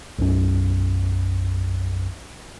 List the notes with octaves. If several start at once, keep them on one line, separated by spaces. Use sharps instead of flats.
B1 F#2